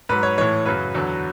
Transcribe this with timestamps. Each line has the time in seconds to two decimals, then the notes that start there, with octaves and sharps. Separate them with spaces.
0.09 G#2 F#3 B4
0.23 C#5
0.38 A2 E3 C#5
0.66 F#2 C#3 F#3 B4
0.94 E2 D3 F#3